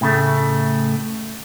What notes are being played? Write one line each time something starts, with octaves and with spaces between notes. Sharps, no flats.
A2 C#3 A3